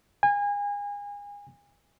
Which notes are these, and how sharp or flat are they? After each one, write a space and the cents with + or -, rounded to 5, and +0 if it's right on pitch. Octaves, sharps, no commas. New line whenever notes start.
G#5 -30